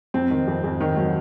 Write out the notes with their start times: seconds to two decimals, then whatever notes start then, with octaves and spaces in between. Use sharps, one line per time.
0.14 F2 C4
0.31 D#3
0.47 F2
0.64 F2
0.80 D#3
0.97 F#3